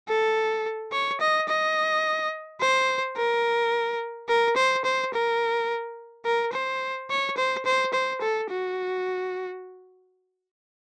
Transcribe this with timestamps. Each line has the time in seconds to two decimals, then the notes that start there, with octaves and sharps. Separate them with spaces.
0.09 A4
0.92 C#5
1.20 D#5
1.48 D#5
2.60 C5
3.17 A#4
4.29 A#4
4.56 C5
4.85 C5
5.14 A#4
6.25 A#4
6.53 C5
7.10 C#5
7.37 C5
7.65 C5
7.93 C5
8.21 A4
8.50 F#4